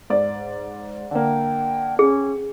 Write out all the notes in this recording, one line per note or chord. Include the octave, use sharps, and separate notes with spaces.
G#2 D5
D3 A#3 G5
C#4 G#4